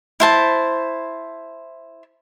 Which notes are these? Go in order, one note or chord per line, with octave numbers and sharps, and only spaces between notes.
E4 C5 A5